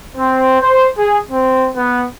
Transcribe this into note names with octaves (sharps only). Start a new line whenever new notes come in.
C4
C5
G#4
C4
B3